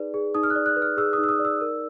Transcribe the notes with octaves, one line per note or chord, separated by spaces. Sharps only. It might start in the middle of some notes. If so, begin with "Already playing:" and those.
Already playing: D#4 G#4 B4 D5
G#4
D#4 D#6
F6
F#6
D5
F#6
B4
F6
G#4 E6
D#6
D#4
E6
D#6
D5
E6
A#4